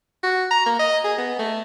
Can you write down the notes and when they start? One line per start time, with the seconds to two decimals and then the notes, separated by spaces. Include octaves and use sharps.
0.23 F#4
0.51 A#5
0.66 A#3
0.79 D#5
1.04 G#4
1.18 B3
1.39 A3